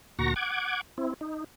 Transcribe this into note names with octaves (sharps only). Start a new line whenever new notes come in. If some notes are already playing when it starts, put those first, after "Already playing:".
D2 A#2 F#4 A#5 C#6 A#6
F#5 D6 G#6
C4 E4
D#4